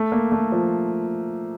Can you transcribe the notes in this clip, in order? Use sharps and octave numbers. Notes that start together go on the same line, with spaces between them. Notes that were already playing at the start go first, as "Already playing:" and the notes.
Already playing: A3
A#3
A3
F3